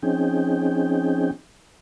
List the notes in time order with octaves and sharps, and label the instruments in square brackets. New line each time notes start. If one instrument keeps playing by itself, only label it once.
[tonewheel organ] F3 C4 C#4 D#4 G#4 G5